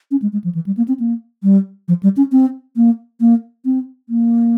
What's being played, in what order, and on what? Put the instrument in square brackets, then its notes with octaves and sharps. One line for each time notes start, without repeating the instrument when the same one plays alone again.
[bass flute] C#4
G#3
G#3
F3
E3
G3
A#3
C4
A#3
G3
F3
G3
C#4
C4
A#3
A#3
C4
A#3